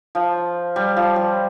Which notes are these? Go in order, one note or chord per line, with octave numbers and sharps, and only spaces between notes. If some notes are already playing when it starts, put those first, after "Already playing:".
F3
G3
F3
G3